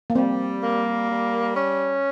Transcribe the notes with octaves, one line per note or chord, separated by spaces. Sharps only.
A#3
G3 C4
A#3
G3
C#4